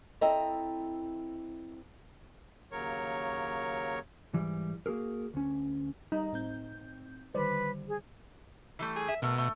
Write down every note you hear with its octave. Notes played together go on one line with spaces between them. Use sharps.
C4 E4 A4 D#5 A#5
D#2 C#3 F#3 A#4 C#5 C#6
G#2 E3 G3
A#3 F#4 G#4 A#4
D2 C#4
G3 D#4
A2 C4 G6
D3 D#3 G3 B4 C5 D5
G#4
E3 G3 A3
G#4
E5
B2 A3 A#4
A3